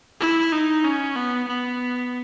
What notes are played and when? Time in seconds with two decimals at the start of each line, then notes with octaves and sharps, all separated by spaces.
0.20 E4
0.52 D#4
0.84 C#4
1.16 B3
1.48 B3